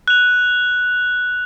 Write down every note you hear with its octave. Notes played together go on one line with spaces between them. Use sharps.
F#6 F7